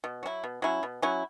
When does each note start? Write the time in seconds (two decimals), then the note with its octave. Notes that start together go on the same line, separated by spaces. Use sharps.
0.04 B2
0.23 F#3 C#4 E4
0.44 B2
0.62 F#3 C#4 E4
0.83 B2
1.02 F#3 C#4 E4